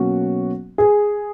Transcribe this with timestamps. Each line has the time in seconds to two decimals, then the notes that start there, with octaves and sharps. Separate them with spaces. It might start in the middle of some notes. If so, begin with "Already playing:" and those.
Already playing: B2 F#3 A#3 C#4 F#4
0.78 G#4